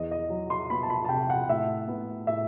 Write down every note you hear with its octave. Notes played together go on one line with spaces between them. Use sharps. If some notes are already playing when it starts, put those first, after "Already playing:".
Already playing: E2 D#5
D#5
F#3
C6
B3 B5
A5
B5
A5
C3 G5
F#5
A2 E5
B3
A2 E5